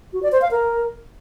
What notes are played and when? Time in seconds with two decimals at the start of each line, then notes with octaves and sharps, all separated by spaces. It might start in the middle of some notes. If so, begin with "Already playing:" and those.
0.13 F#4
0.23 D5
0.32 C5
0.42 F5
0.51 A#4